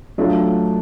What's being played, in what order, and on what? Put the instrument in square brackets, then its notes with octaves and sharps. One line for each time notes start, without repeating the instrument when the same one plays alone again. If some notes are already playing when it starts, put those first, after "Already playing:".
[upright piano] F#3 A3 D4 F4